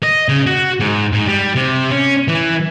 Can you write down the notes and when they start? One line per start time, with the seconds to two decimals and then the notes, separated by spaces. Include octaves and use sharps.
0.03 D#5
0.29 C#3
0.47 F#4
0.80 G#2
1.12 G#2
1.27 G3
1.56 C3
1.90 C#4
2.28 E3